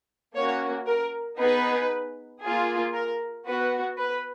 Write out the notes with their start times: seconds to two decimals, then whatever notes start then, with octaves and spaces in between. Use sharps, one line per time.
0.34 A#3 C#4 F#4 C#5
0.87 A#4
1.38 B3 D#4 G#4 B4
2.42 A#3 F4 G#4
2.94 A#4
3.46 B3 F#4 B4
3.97 B4